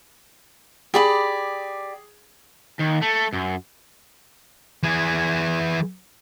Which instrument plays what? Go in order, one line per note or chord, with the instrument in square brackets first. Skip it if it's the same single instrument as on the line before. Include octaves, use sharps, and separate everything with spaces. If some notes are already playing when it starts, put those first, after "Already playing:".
[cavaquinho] G4 D5 B5 [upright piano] G#4
[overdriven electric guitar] D#2
A3
F#2
[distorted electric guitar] E3 G#4